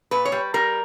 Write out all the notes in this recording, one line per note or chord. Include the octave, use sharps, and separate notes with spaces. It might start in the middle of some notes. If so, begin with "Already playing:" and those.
A#2 B4
C#5
G3
G3 A#4